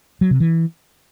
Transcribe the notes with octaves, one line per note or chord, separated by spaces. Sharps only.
F#3
C3
E3